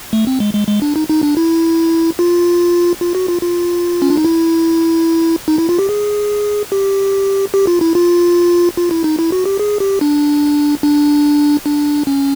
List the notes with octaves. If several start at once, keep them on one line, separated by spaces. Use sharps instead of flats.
A3
C4
G#3
G#3
G#3
D4
D#4
D#4
D4
E4
F4
F4
F#4
F4
F4
C#4
D4
D#4
E4
D#4
E4
F4
G4
G#4
G4
G4
F4
E4
F4
F4
E4
D#4
E4
F#4
G4
G#4
G4
D4
D4
D4
C#4